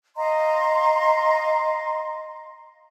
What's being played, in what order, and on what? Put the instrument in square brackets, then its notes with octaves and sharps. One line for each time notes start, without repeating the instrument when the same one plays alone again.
[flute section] D#5 F5 A#5 C6